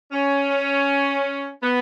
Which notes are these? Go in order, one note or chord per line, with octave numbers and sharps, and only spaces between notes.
C#4
B3